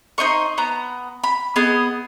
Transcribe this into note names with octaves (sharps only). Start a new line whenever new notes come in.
D#4 C5 D#5 C#6
B3 A#5
B5
B3 G#4 D#5 D#6